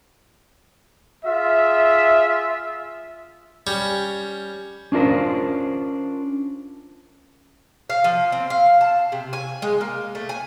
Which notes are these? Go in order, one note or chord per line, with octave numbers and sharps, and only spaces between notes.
F4 G#4 E5
G3 C#4
C#4 D4 F4 A#4 C5
F5
F3
C4
F5
A5
C3
G#5
G#3
A#3
A3
G#5